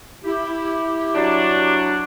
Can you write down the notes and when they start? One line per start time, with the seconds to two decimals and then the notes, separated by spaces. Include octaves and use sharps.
0.24 E4 G4
1.15 F#3 D4